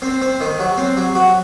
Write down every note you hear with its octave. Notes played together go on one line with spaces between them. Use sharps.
C4
C4
D#3
F#3
C4
F#3
F#4